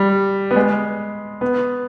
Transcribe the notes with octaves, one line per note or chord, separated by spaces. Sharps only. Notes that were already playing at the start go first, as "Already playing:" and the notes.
Already playing: G3
B3
G#3
B3